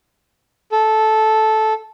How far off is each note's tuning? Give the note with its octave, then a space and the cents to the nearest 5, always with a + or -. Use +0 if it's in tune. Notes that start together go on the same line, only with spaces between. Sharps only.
A4 -10